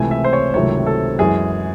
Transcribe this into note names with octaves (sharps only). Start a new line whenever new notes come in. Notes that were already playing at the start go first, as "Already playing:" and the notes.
Already playing: C#2 C3 E3 A3 G#5
E5
C5
C#5
C#2 C3 D#3 F#3 A3 C#5
A4
F#2 E3 G#3 G#4